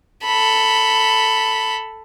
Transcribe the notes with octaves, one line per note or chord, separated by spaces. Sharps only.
A4 B5